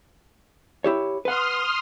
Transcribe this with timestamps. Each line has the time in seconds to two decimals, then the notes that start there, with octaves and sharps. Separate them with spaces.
0.84 E4 G4 C#5
1.25 B4 F#5 C6 D#6 F6